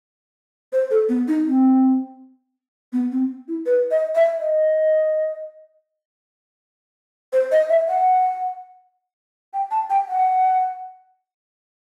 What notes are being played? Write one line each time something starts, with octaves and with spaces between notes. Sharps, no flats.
C5
A4
B3
D#4
C4
B3
C4
E4
B4
D#5
E5
D#5
C5
D#5
E5
F#5
G5
A5
G5
F#5